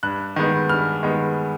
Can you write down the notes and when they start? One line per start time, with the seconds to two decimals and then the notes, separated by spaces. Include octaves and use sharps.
0.03 G2 F#6
0.36 D#3 G#3 B3
0.69 G2 F6
1.03 D#3 G#3 B3